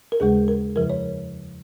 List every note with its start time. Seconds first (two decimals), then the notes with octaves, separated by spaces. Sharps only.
0.12 A#4
0.20 D#2 C#3 G#3 G#4
0.48 A#4
0.76 F2 C#3 F3 A#4
0.90 C#5